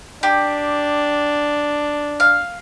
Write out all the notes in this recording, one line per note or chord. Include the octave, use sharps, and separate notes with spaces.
D4 G4
F5